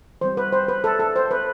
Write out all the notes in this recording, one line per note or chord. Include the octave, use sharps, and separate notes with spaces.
E3 G3 C4 C5
B4
C5
B4
A4
A4
C5
B4